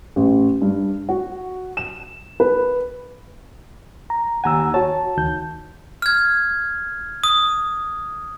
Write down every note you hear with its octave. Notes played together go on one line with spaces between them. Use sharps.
A1
G2
F#4
E7
B4
A#5
D#2 F#5 G#5 A#5 E6
F#4 C#5 A5
D2 D#3 G6
F6 G#6
D#6